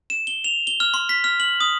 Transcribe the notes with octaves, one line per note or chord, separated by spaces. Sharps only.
E7
G7
F7
G7
F6
C6
B6
F6
F#7
D#6